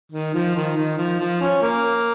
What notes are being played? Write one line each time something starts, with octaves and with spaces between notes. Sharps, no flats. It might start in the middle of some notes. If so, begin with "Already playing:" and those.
D#3
F3
D#3
D#3
F3
F3
C#4
A#3